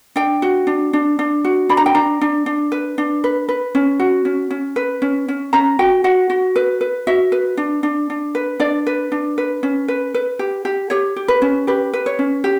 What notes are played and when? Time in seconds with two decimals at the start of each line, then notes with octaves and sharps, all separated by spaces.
0.16 D4 G5
0.42 F#4
0.67 D4
0.93 D4
1.19 D4
1.45 F#4
1.69 D4 B5
1.77 A#5
1.86 G5
1.95 D4 A#5
2.21 D4
2.46 D4
2.72 B4
2.98 D4
3.24 B4
3.48 B4
3.75 C#4
4.00 F#4
4.25 C#4
4.50 C#4
4.76 B4
5.02 C#4
5.28 C#4
5.53 C#4 A#5
5.79 F#4 G5
6.04 F#4 F#5
6.30 F#4
6.56 B4
6.81 B4
7.07 F#4 E5
7.32 B4
7.57 D4
7.83 D4
8.10 D4
8.35 B4
8.60 D4 D5
8.87 B4
9.12 D4
9.38 B4
9.63 C#4
9.88 B4
10.14 B4
10.39 G4
10.65 G4
10.90 G4 C#5
11.16 G4
11.28 B4
11.42 C#4
11.67 G4 B4
11.93 B4
12.06 C#5
12.19 C#4
12.44 G4